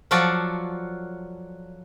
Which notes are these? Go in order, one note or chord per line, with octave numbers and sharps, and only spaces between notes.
F3 F#3 F4 F#4 A4 D5